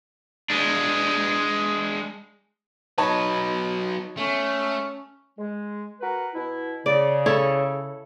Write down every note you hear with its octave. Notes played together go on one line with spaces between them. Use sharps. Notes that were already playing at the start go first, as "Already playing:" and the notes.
G#3 D4
F#3 D#4 B4 C#5 A5
A3 C#4
G#3
F#4 A#4 B4
B2 E4
C#3 D5
E4 A4 C#5